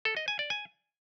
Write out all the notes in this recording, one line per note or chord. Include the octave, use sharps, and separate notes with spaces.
A4
D#5
G#5
D5
G#5